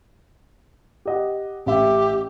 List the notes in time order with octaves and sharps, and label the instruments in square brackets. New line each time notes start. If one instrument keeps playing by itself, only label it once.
[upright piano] G4 D#5 F#5
[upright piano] A1 E5 [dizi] G4